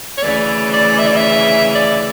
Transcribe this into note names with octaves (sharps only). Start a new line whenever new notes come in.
C#5
D2 C#3 E3 D5
D5
E5
D5
E5
D5